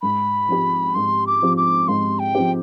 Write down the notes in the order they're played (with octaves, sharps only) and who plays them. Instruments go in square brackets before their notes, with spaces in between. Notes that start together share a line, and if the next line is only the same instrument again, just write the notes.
[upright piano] G#2 [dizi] B5
[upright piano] F3 C4 G4
[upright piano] G#2 [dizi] C6
[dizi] D6
[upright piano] F3 C4 G4
[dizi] D6
[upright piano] G#2 [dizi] C6
[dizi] G5
[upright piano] F3 C4 G4